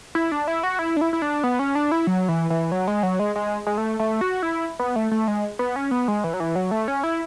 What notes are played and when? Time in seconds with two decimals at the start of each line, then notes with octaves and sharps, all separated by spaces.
0.15 E4
0.32 D4
0.48 E4
0.63 F#4
0.79 E4
0.97 D4
1.01 E4
1.13 E4
1.22 D4
1.44 B3
1.59 C#4
1.75 D4
1.92 E4
2.07 F#3
2.28 E3
2.50 E3
2.72 F#3
2.88 G#3
3.03 F#3
3.19 G#3
3.36 G#3
3.67 G#3
3.78 A3
4.00 A3
4.21 F#4
4.43 E4
4.79 B3
4.96 A3
5.12 A3
5.28 G#3
5.59 B3
5.76 C#4
5.91 B3
6.08 G#3
6.24 E3
6.34 F#3
6.40 E3
6.56 F#3
6.71 A3
6.88 C#4
7.03 E4